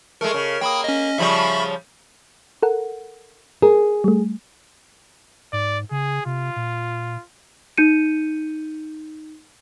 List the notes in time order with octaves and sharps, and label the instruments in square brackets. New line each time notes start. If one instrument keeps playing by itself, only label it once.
[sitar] G#3 A3 [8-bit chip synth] A#4
[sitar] C#3
[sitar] A#3 [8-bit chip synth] G5 B5 D#6
[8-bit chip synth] C#4 D#5
[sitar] C#3 F3 G3 [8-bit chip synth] E5 B5 C#6
[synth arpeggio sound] A4 A#4 F#5
[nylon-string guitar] G#4 [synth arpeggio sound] A#4
[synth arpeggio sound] G3 A3
[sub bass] G#2 [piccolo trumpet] D5
[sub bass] C#3 [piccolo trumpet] G#4
[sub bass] C3 [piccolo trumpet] F4
[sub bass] A#2
[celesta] D#4 G6 C#7 D#7